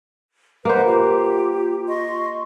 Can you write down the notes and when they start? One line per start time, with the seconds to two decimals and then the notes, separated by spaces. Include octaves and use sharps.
0.65 A#3 B4 C5 D#5 F#5
0.84 F4 G4
1.88 D#5 C6 C#6